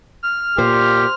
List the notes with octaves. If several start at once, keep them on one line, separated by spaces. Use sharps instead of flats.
F6
A#2 G4 C5